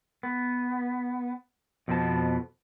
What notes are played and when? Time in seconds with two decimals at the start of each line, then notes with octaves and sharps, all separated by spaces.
0.23 B3
1.88 F2 B2 F3 B3 A5